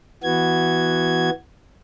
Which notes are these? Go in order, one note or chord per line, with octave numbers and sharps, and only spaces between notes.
E3 B3 F#4 G#6